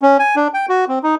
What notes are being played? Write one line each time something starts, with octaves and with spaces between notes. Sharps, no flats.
C#4
G#5
D4
G5
F#4
C4
D#4